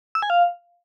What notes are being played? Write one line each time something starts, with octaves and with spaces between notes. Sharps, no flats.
E6
G#5
F5